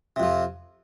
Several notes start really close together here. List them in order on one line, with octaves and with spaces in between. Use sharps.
C3 F2 F3